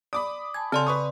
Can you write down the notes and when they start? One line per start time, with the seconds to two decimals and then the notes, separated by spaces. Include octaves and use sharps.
0.13 D5 B5 D6 D#6
0.54 G#5 A5 G#6
0.72 C#3 C4 A4 D5 G#5 C6
0.87 B4 C#6 D#6